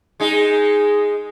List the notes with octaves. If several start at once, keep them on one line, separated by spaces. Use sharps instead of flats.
G#3 D#4 G#4